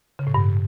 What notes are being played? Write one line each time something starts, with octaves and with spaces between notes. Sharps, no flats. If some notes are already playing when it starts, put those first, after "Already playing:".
C#3
A2
G2